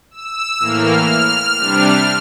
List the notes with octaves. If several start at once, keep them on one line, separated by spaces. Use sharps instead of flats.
E6
A2 E3 A#3 F6
C3 G3 D4